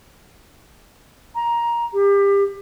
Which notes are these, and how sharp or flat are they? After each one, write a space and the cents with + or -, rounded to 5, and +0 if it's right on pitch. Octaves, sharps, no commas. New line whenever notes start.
A#5 +15
G4 +30